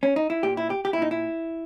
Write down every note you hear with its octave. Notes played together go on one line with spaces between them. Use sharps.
C#4
D#4
E4
A#2 G4
E4
G4
G4
E4
A#2 D#4
E4